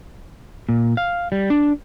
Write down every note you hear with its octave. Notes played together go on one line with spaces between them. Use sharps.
A#2
F5
G3
D4